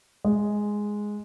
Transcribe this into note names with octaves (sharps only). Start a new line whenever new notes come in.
G#3